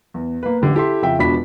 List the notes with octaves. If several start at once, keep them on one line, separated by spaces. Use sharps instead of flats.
E2
A#3 B4
A1 D3 G4
E4 G4 A4 E5 C6
F2 C#3 E5 G5
E1 B2 F3 D4 B5 B6